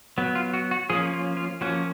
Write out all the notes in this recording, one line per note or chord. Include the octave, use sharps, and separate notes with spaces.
F#3 B3
F4
F#4
F#4
F3 A#3 C#4 G#4
F4
F4
F3 A#3 C#4 F#4